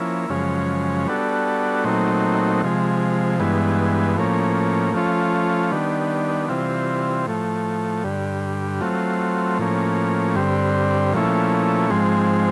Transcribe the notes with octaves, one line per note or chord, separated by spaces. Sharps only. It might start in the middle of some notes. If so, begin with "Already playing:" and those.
Already playing: F3 A#3 C#4 E4
F#2 C#3 F3 G#3 C#4
G3 B3 D4 F#4 A4
A#2 F#3 A3 C4 D#4
C3 F3 G#3
G2 E3 G#3 B3
A2 F3 A#3 C#4
F3 A3 C#4 F4
D#3 G3 B3 D4
C3 E3 G3 C4 F4
A2 F3 A3
G2 D3 G3
F#3 A3 C4 F4
A2 F3 A#3 C#4
G2 D3 G3 C4
A#2 F3 A3 C#4 E4
G#2 F3 G#3 C4